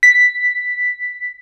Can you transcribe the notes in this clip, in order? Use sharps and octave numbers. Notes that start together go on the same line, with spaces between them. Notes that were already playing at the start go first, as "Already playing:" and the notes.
B6